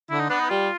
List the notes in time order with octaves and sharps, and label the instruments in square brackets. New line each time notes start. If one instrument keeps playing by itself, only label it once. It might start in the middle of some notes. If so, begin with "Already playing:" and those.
[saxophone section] D3 [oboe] E4
[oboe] D#4
[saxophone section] B3 [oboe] D4
[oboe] D#4
[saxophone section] G3 [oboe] F4